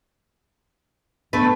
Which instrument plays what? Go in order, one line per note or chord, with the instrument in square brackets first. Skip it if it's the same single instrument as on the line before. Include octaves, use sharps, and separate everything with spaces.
[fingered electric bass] A2 B3 D4 [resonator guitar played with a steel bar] A3 B4